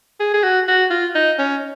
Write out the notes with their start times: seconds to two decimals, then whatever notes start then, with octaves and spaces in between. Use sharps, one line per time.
0.20 G#4
0.34 G#4
0.43 F#4
0.68 F#4
0.90 F4
1.15 D#4
1.39 C#4